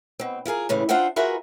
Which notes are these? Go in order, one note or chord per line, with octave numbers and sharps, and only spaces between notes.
B2 C4
E4 F4 G#4 A#4
A2 C#3 E3 A3
D4 F4 C5 E5 F#5 G5
F4 F#4 G#4 A#4 B4 E5